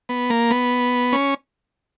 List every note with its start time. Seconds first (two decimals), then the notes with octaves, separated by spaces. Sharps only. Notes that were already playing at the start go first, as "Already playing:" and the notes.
0.09 B3
0.30 A#3
0.51 B3
1.13 C#4